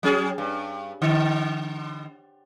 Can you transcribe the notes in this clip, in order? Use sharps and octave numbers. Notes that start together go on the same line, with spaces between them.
F#3 C#4 G#4
G2
D3